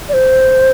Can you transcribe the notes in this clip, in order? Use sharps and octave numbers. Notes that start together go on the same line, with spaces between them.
D5
C5